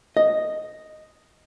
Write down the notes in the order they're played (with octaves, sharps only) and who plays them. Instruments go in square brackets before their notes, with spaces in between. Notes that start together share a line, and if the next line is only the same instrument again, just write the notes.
[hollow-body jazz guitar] D#5